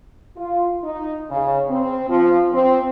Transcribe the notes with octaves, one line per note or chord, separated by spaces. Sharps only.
F4
D#4
C#3
C4
F3
C4